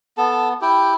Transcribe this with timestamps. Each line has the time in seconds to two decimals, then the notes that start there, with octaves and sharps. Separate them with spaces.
0.18 B3 A4 A5
0.61 E4 G4 G5